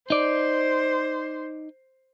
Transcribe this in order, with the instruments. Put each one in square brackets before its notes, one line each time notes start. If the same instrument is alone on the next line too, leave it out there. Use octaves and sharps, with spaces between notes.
[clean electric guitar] D#4 D5 [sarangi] C5